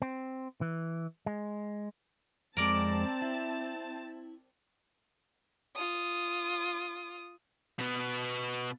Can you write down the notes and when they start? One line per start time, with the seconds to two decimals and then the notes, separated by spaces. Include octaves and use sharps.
0.02 C4
0.61 E3
1.26 G#3
2.57 F2 G#3 C4 A#4 D5 A5
3.22 E4
5.75 F4 D#6
7.79 B2 B3